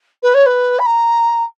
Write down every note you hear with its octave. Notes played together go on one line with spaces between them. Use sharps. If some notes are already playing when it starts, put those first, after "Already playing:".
B4
C#5
B4
B5
A#5